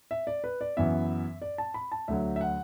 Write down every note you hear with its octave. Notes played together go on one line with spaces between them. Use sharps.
E5
D5
B4
D5
F#2 E3 B3 E5
D5
A5
B5
A5
D2 D3 F#3 E5
E5
F#5